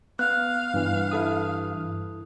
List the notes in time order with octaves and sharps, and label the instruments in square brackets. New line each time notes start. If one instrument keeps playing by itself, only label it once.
[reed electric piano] B3 [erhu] F5 [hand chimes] F#6
[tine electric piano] G2 E3
[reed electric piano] E4 A4 D#6